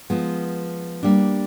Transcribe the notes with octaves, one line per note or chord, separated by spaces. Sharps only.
F3 G#3 B3
G3 A#3 D4